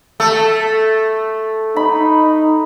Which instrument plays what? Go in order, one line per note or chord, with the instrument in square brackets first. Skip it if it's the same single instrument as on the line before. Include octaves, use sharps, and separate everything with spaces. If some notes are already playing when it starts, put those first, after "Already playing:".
[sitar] A3 [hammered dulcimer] A4
[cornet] D#4 [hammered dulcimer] B5